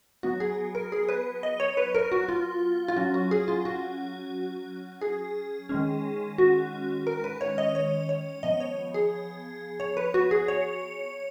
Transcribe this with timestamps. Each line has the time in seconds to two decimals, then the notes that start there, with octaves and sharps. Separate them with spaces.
0.23 F#3 B3 F#4
0.40 G#4
0.75 A#4
0.92 G#4
1.09 B4
1.43 D#5
1.60 C#5
1.77 B4
1.95 A#4
2.12 F#4
2.29 F4
2.88 F4
2.96 F#3 C#4 F#4
3.14 F#4
3.31 G#4
3.48 F4
3.65 F#4
5.02 G#4
5.69 D#3 G#3 C#4
6.38 F#4
7.07 A#4
7.24 B4
7.41 C#5
7.58 D#5
7.75 C#5
8.09 C#5
8.43 F3 B3 D#5
8.60 C#5
8.94 G#4
9.80 C#5
9.97 B4
10.14 F#4
10.31 G#4
10.48 C#5